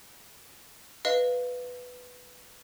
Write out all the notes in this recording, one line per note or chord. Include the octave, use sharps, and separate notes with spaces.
B4 D#5 F5